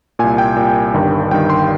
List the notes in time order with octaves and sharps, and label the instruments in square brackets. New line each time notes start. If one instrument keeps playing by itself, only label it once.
[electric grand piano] C2 A#2 G#5
G5
C2 A#2
G1 G2 D#3
G1 G2 D#3 G5
C6